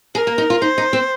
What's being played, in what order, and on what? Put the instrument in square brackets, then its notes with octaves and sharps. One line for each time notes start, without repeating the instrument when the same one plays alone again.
[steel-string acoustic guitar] G#4 [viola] A#4
[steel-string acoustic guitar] A#3
D#4
F4
[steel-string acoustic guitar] D#4 [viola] C5
[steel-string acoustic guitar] D#4
C4